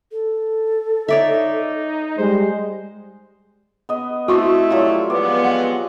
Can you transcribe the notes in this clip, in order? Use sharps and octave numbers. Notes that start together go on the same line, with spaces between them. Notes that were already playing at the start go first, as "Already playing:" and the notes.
A4
D#4 C#5 D5 E5
G3 G#3 C5
B3 D#5
A3 C4 E4 F#4 C5 C#6
F#3 G3 F4
F3 G#3 B3 D5
F#5